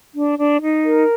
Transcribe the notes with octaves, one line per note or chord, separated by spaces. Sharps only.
D4
D4
D#4
A#4